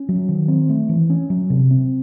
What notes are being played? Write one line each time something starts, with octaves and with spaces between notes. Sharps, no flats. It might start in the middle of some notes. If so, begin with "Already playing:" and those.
Already playing: C#4
F#3
D#3
C4
A3
E3
C#4
F#3
C3
C4